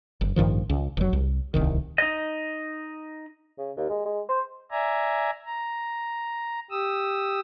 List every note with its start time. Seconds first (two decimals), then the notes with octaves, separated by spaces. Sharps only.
0.21 F#1
0.36 A1 G2 D#3 F3
0.69 C#2
0.97 F1 F#3
1.13 C2
1.54 D1 C2 D#3
1.98 D#4 D#5
3.58 C#3
3.77 D#2
3.89 G#3
4.05 G#3
4.29 C5
4.71 D5 E5 G#5 A#5
5.46 A#5
6.71 G4 D#6 E6